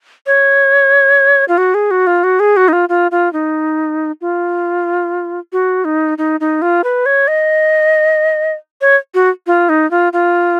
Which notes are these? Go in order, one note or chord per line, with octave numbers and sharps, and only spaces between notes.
C#5
F4
F#4
G#4
F#4
F4
F#4
G#4
F#4
D#4
F4
F4
F4
D#4
F4
F#4
D#4
D#4
D#4
F4
B4
C#5
D#5
C#5
F#4
F4
D#4
F4
F4